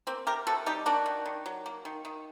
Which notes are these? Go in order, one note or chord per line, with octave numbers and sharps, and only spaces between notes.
A#3 C4
C3 G4 A#4
C3 F#4 A4
G3 D#4 G4
A#3 D4 F#4
D#3
D#3
F#3
A#3
D#3
D#3